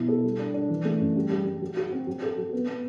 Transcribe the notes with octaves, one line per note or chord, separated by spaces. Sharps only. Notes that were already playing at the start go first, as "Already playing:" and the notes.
Already playing: B2 F#3 E4
A4
G3
D4
D4
E3
A3
F#2
G3
G3
G3
F#3
F#4
C4
F#3
A4
F#3
B3
B3